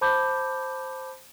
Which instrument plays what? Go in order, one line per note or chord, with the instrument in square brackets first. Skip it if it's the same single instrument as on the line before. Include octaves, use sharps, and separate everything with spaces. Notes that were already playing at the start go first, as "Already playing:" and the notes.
[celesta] C5 A5 B5 D6 G6